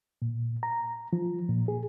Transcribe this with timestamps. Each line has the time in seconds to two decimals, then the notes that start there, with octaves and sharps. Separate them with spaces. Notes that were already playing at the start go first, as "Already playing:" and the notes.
0.22 A#2
0.63 A#5
1.13 F3
1.49 A#2
1.68 G#4